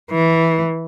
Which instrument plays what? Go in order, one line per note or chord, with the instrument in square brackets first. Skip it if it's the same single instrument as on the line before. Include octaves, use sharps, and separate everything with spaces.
[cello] E3